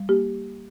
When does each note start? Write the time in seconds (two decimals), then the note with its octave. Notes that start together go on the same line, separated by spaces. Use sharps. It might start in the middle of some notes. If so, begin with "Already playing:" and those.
Already playing: G3
0.09 A#3 G4